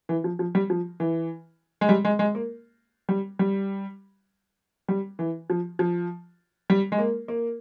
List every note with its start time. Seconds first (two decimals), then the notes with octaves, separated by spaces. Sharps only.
0.09 E3
0.24 F3
0.39 F3
0.55 G3
0.70 F3
1.00 E3
1.81 G#3
1.89 G3
2.05 G#3
2.19 G#3
2.35 A#3
3.09 G3
3.39 G3
4.88 G3
5.19 E3
5.50 F3
5.79 F3
6.70 G3
6.92 G#3
6.98 A#3
7.28 A#3